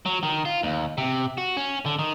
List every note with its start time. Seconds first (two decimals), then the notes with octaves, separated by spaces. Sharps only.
0.06 F#3
0.23 D#3
0.45 F4
0.63 D#2
0.98 C3
1.38 F#4
1.57 C#4
1.86 D3
1.99 D#3